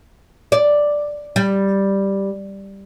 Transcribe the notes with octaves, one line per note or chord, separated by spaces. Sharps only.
D5
G3